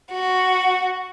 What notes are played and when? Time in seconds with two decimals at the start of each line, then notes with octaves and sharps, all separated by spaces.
0.12 F#4